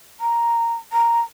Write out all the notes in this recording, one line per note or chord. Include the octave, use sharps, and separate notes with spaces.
A#5
A#5